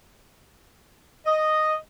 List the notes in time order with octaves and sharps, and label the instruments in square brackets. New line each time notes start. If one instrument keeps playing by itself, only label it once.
[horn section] D#5